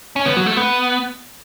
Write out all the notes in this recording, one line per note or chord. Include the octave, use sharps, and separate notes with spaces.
C#4
B3
F#3
A3
B3